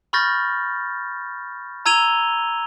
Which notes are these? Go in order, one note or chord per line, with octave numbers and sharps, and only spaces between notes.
B5 C#6 F6 G6 A6 A#6
A#5 E6 G#6 D#7 F7 G7